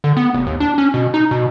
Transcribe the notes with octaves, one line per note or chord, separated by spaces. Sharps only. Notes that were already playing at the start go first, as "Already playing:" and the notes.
D3
B3
F1
D#2
D4
C#4
B2
D#4
B2